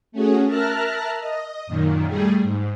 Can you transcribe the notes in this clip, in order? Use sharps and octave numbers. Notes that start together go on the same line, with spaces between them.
A3 C#4 F#4 G#4
A#4 E5 A5 A#5 F6 F#6
D#5
F#2 A#2 D#3
G3 A3 G#4
G#2